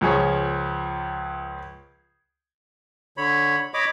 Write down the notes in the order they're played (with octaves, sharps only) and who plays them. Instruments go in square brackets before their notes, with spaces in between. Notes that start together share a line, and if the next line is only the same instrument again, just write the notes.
[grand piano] C#2 F3 G#4 C#5
[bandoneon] D3 C#5 B5
C#5 D#5 B5 D6